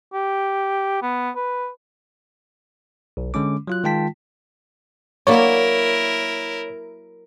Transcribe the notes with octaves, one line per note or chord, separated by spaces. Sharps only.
G4
B3
B4
B1
D3 G#3 C#4 D6
F#3 F4 F#6
D#3 G#3 F4 G5 A5 B6
F#3 A#3 E4 A#4 C#5 D5